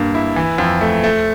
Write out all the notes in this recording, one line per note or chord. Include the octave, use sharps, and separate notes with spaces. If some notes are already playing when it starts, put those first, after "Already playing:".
Already playing: G2 A#3
E4
E3
F2
A3
A3